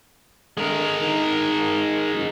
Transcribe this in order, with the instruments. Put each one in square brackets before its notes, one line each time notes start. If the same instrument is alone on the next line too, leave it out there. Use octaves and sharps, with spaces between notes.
[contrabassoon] D3 [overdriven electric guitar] G#3 A#4
[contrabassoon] D#3
F#1